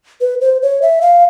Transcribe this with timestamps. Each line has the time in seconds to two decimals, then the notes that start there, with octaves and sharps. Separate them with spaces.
0.21 B4
0.41 C5
0.62 C#5
0.82 E5
1.02 F5